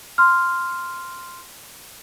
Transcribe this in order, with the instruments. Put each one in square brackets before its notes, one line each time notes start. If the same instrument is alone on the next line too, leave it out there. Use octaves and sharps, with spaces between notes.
[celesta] C6 F6